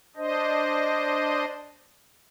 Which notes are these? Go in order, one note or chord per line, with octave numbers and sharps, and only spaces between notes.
D4 C5 D#5